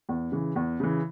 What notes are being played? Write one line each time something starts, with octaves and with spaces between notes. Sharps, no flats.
E2
C#3 E3
E2
C#3 E3